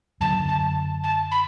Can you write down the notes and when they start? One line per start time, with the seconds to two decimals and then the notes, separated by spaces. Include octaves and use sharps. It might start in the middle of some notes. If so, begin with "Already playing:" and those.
0.21 F#2 D3 F#3 A5
0.48 A5
1.04 A5
1.31 B5